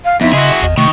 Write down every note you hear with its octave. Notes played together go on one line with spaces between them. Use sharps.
F5
F2 B3 D#4 E4
C#3 F#4 G#4 D#5 C6
G#1 E2 D#5
C3 D#3 A3 C#6